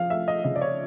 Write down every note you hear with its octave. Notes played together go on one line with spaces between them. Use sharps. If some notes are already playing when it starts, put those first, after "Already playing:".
Already playing: F3 F5
A3 E5
D#5
C#3 D#5
D5
C#5